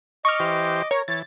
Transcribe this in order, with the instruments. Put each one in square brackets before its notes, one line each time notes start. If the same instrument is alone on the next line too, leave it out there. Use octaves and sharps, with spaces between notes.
[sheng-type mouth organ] D#5 D6 [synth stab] C#6 F6
[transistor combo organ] E3 G4 C5
[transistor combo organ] A#4 [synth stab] C#5
[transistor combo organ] E3 [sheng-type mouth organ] C#5 [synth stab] A6